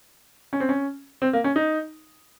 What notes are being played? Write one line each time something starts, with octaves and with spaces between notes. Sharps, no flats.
C#4
C4
C#4
C4
A#3
C#4
D#4